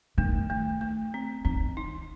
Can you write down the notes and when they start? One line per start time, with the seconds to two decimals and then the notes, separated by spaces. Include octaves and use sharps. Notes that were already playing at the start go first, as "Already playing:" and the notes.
0.18 D#3 A3
0.50 A3
0.81 A3
1.14 C4
1.45 D#3 C4
1.77 D#4